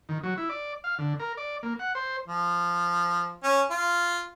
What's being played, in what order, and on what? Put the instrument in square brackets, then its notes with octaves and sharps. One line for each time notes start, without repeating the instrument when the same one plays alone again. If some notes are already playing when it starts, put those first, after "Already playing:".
[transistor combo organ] D#3
F#3
E4
D5
F5
D3
A#4
D5
A#3
F#5
C5
[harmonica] F3
C#4
F4